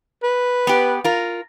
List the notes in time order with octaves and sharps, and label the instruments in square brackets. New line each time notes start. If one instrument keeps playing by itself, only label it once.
[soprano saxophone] B4
[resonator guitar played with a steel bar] B3 G4
F4 A#4